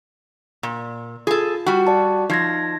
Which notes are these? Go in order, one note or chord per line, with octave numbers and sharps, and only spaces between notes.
A#2
F4 G#4 A4
G3 F#4
D5 A5
F3 D#4 G#6 A#6